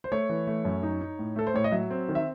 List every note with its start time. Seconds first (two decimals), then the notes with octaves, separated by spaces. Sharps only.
0.04 C5
0.12 A3 C#5
0.29 E3
0.47 A3
0.65 F#2
0.83 D#4
1.01 D#4
1.19 A2
1.36 A3 A4
1.47 C5
1.54 A2 C#5
1.64 D#5
1.72 F#3 E5
1.90 C4
2.08 D#3
2.15 E5